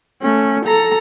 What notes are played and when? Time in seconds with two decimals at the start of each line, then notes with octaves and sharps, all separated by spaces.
0.22 A3 C#4
0.65 A4 A#5